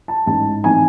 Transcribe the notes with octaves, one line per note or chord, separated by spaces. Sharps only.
A5
A1 G#2 E3 A5
A2 E3 C4 D#4 G#5